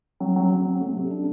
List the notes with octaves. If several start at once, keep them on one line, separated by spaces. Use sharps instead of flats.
F#3
F#3
F#3
C4
A3
C3
D4